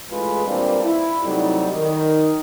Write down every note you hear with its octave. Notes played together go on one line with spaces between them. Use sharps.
A1 A2 G#3 F4 G#4 B4
A#2 E3 G3 A#3 C4 D4
E4
C3 F#3 G3 A3 D#4
D#3